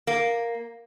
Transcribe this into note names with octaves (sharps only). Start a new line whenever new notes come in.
A#3